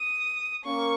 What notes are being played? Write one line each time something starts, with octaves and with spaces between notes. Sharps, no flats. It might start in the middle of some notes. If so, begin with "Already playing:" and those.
Already playing: D#6
A#3 C#4 A#4 C#6